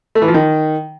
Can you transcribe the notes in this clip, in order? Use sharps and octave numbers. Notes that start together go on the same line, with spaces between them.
A3
E3
F3
D#3